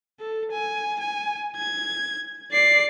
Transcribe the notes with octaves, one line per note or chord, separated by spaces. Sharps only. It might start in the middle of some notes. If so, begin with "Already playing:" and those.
A4
G#5
G#5
G#6
D5 C7